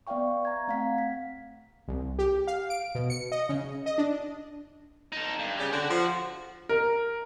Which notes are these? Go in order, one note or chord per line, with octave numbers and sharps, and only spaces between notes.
B3 D5 E5 F5 G5 C#6
A#5 G#6
A3 C4 F5 F#5 B6
B6
C2
G4
F5
D7
B2
C#7
D#5
C#3
D#5
D4
D#4 A4
G2
C#3 G4
D3 F#4 F#5
F3
A#4